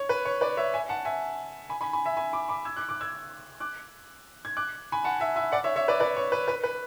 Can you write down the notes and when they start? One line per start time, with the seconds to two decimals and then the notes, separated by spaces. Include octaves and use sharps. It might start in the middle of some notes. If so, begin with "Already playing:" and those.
Already playing: C#5
0.09 B4
0.25 C#5
0.41 B4 D5
0.57 C#5 E5
0.74 E5 G#5
0.89 F#5 A5
1.05 E5 G#5
1.69 G#5 B5
1.81 G#5 B5
1.93 G#5 B5
2.05 E5 G#5
2.17 G#5 B5
2.33 B5 D6
2.49 B5 D6
2.65 E6 G#6
2.76 D6 F#6
2.89 D6 F#6
3.01 E6 G#6
3.60 D6 F#6
4.45 G#6
4.57 D6 F#6
4.92 G#5 B5
5.04 F#5 A5
5.20 E5 G#5
5.36 E5 G#5
5.52 D5 F#5
5.64 C#5 E5
5.76 C#5 E5
5.88 B4 D5
6.00 B4 D5
6.16 C#5
6.32 B4
6.48 B4
6.64 B4